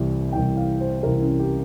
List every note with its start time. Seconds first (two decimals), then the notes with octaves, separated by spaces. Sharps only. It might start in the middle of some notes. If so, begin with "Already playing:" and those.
Already playing: C2 C3 E3
0.33 C2 C3 E3 G5
0.57 F5
0.81 C5
1.03 C2 C3 E3 A#4
1.21 C#4
1.39 G4